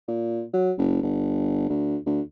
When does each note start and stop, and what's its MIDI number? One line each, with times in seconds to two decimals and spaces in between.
0.08 0.44 46
0.53 0.72 54
0.77 1.00 30
1.03 1.65 31
1.69 1.97 38
2.06 2.20 38